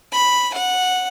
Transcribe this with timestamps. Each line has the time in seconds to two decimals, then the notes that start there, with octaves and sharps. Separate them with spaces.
0.12 B5
0.54 F#5